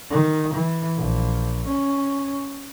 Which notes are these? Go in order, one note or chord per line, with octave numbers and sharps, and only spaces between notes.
D#3
E3
A#1
C#4